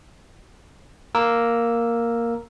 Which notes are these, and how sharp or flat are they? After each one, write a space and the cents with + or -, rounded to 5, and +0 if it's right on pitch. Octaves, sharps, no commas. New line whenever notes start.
A#3 +0 A#4 +0 E6 +0